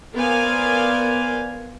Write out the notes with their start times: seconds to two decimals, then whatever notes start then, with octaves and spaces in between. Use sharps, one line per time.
0.14 B3 A#4 C5 D5 F5 G#5